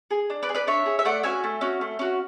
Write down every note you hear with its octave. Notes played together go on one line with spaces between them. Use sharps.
G#4
D4
B4 D5
G#4
B4 D5
D4 C#5 E5
G#4
E5
A3 D5 F#5
C#4 F#4 E5 G#5
A3
C#4 F#4
A3
C#4 F#4